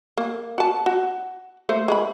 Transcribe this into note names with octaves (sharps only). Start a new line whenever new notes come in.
A#3
F#4 A5
F#4
A3 A#3 C5
G#3 B4 B5